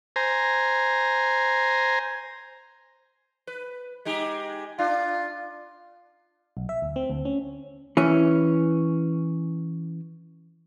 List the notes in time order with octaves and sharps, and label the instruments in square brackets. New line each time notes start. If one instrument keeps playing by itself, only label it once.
[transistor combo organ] C5 G#5 A#5
[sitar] B4
G#3 D#4 G4
[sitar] D4 [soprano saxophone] F4
[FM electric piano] B1
E5
D2
C4
D2
C#4
[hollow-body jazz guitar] E3 C#4